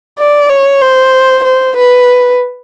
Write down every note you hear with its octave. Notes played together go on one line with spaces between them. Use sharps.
D5
C#5
C5
C5
B4